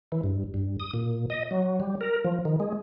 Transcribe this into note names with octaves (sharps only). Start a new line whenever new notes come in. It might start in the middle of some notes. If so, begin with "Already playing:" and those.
E3
G2
G2
D#6
A#2
D#5
F#3
G3
A#4
F3
D#3
G#3